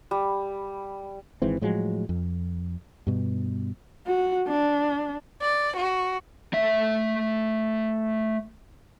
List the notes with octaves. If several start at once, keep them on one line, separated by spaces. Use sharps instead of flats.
G3
G#1 G#2 E3 C4
A2 F3 F#3 G#3
F2
G2 B2
F#4
D4
D5
F#4
A3 E5